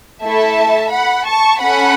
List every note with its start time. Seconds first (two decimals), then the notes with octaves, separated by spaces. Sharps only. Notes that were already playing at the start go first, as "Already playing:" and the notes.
0.23 A3 E4 A4 E5 A5
0.91 F#5 B5
1.26 A5 C#6
1.60 C#4 A4 F#5 B5